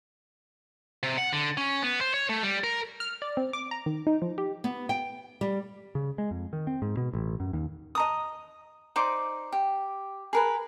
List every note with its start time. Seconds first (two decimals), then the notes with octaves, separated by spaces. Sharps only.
1.03 C3
1.18 F#5
1.33 D3
1.57 C#4
1.82 B3
2.01 C5
2.14 C#5
2.29 A3
2.43 G3
2.64 A#4
3.00 F6
3.22 D5
3.37 C4
3.53 D6
3.71 A#5
3.86 D#3
4.07 D#4
4.22 F3
4.38 G4
4.64 B3
4.89 G5
5.41 G3
5.95 C#3
6.18 G#3
6.31 F2
6.53 D#3
6.67 C4
6.82 G#2
6.97 B2
7.13 A1
7.40 F#2
7.53 D#2
7.95 D#5 A#5 D#6
8.96 D#4 C5 D5 D6
9.52 G4
10.33 G#4 A#4 B4